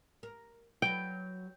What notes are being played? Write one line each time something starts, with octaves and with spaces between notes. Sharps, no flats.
A#4
F#3 F#4 B4 G5